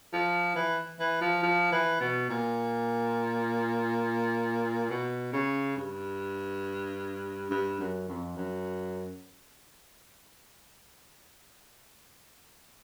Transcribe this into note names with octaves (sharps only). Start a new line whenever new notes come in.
F3
E3
E3
F3
F3
E3
B2
A#2
B2
C#3
G2
G2
F#2
F2
F#2